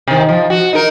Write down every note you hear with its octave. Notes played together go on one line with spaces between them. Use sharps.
C3 D#3
F3
F#4
D#4 A#4